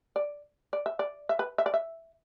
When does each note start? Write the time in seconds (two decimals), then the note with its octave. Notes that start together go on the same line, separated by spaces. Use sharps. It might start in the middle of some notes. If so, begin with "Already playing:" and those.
0.16 D5
0.73 D5
0.86 E5
0.99 D5
1.29 E5
1.39 B4
1.58 E5
1.66 D5
1.74 E5